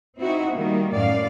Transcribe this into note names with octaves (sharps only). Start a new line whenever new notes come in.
C4 D#4 E4 F#4
D#3 G3 A#3
F#2 A2 D5 F5